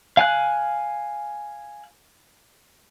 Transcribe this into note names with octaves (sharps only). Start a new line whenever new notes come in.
F5 G#5 F#6